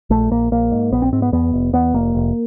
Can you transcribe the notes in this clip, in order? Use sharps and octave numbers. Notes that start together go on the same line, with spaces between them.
A#1 A3
A#1 A#3
A#1 A#3
G#2
A#1 B3
C4
G#2 C4
B3
E2 B3
F1
E2 B3
F1 A#3
F1